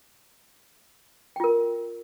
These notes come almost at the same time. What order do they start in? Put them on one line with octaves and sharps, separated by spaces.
G5 F4 A#4